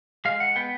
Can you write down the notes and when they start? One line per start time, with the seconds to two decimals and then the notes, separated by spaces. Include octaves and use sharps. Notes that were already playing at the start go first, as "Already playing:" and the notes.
0.25 G#3 F5
0.40 F#5
0.56 B3 G5